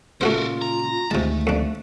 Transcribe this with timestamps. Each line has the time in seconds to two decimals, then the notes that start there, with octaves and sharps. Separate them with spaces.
0.21 A#2 C#3 A3 F4 F#4 A4 A#4 C5
0.62 A#5
1.11 D2 C3 D#3 G#3 A3 A5
1.47 F2 D4